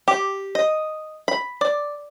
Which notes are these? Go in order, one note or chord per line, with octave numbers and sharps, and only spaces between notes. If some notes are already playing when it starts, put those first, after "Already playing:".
G4
D#5
B5
D5